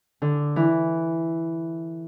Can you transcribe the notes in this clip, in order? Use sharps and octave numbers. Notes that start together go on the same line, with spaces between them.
D3
E3